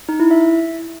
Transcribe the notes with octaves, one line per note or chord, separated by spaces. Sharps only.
D#4
E4
E5